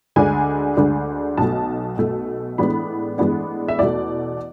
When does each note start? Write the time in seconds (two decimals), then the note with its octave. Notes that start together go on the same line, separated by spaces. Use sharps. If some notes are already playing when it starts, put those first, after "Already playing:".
0.16 D2 D3 G#3 D4 G#5
0.77 D2 D3 G#3 D4
1.38 B1 B2 A3 A5
1.98 B1 B2 A3
2.58 A2 E3 G#3 B3 D4 B5
3.18 A2 E3 G#3 B3 D4
3.68 E5
3.79 E2 B2 A3 D5